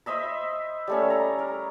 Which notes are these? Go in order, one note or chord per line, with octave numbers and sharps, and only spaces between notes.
C5 D#5 E5 B5
G3 A3 C#4
A#5
A#4